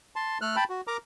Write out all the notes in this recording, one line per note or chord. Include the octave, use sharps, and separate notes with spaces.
A5 C6
A3 A4 F6 F#6
G5 A5 B5
F#4
A#4 A#5 D6